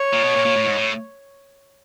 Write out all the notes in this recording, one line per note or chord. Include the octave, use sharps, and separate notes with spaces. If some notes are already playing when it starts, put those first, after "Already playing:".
Already playing: C#5
A#2
B2
A#2
A#2
A2
G#2
A2